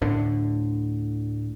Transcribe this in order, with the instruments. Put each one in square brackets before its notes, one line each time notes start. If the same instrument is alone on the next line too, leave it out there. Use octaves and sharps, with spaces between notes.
[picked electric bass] D2 A2 D3